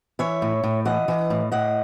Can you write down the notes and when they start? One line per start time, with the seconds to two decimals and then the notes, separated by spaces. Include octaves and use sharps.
0.19 E3 C#5 E5
0.42 A2
0.63 A2
0.85 E3 D#5 F#5
1.08 E3
1.30 A2
1.52 A2 D#5 F#5